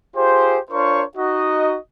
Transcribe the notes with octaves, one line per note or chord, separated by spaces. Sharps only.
F4 G4 G#4 C5
D4 F4 A#4 C5 C#5 C#6
D#4 F#4 D#5